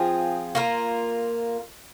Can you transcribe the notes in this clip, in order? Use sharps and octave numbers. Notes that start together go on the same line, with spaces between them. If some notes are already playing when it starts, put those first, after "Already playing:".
Already playing: F3 C4 F4 G#4
A#3 F4 A#4